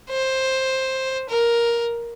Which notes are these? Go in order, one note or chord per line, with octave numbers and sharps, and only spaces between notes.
C5
A#4